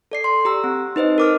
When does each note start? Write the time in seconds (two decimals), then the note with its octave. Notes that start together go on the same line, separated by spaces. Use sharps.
0.12 A4 D5 C7
0.24 C6
0.45 G4 A#5 E6
0.64 C4
0.96 D#4 B4 C5 D#5
1.18 A#4 D6 F6